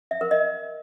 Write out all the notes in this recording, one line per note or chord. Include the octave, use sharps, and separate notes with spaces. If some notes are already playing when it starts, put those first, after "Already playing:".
E5
A#4
D#5